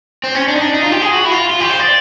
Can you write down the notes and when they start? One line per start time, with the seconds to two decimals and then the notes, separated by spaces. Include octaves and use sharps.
0.24 C4
0.35 C#4
0.48 D4
0.56 D#4
0.60 D4
0.74 D#4
0.83 F4
0.92 G4
1.02 G#4
1.13 F#4
1.25 E4
1.31 F4
1.50 F4
1.60 G4
1.70 C5
1.79 D5